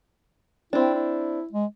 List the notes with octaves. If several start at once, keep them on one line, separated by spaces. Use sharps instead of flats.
C4 D4 E4
E4
G#3